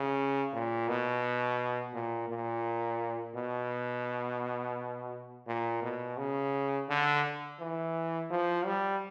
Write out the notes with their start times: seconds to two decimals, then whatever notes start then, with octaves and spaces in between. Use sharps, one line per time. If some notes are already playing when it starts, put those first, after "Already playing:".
Already playing: C#3
0.53 A#2
0.88 B2
1.94 A#2
2.29 A#2
3.35 B2
5.47 A#2
5.83 B2
6.18 C#3
6.89 D3
7.60 E3
8.30 F3
8.65 G3